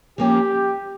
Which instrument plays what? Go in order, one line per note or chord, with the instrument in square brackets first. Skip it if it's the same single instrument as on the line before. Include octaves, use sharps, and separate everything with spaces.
[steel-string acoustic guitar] F3 A#3 C#4 [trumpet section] G4